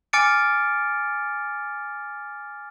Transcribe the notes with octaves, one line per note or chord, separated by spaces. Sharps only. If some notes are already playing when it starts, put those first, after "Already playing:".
G#5 D6 F6 A6 C#7 D7